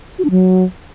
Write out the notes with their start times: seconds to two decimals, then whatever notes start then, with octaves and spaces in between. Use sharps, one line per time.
0.19 F#4
0.25 D4
0.30 F#3